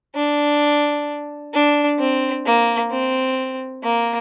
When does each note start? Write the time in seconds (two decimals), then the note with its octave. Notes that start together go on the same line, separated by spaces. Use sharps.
0.15 D4
1.54 D4
1.99 C4
2.46 A#3
2.91 C4
3.83 A#3